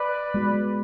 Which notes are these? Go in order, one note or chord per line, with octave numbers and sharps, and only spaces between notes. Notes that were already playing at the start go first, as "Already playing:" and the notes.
Already playing: B4 D5
G#3 B3 F#4